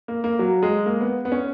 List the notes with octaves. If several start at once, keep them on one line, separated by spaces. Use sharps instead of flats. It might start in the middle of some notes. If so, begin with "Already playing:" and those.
A#3
A#3
F#3
G#3
A#3
B3
B3
C#4